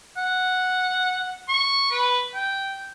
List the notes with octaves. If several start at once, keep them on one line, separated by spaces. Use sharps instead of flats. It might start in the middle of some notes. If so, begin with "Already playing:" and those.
F#5
C#6
B4
G5